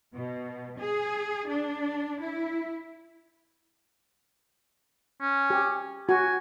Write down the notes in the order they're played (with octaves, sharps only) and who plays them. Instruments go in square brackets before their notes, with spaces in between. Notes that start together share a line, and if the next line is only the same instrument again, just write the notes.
[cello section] B2
G#4
D4
E4
[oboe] C#4
[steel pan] G4
[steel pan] F#4 [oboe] G#5